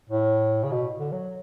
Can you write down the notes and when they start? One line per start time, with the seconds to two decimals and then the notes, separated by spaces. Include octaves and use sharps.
0.10 A2
0.64 C#3
0.72 B2
0.99 D3
1.12 F#3